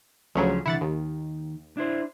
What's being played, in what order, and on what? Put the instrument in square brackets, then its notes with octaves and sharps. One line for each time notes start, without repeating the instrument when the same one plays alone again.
[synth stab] D2 C#3 F#3 [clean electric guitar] F3 C#4 G#4
[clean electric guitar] C2 D3 E3 [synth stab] E4 F#5 A6
[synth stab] D#2 [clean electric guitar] D#3
[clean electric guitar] D4 E4 C5